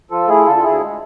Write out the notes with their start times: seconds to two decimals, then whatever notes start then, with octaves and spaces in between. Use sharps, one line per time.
0.11 F3 F4 A4
0.28 A3 E4 G#4
0.46 D3 F4 A4
0.56 F4
0.63 D2 E4 G#4
0.81 G#3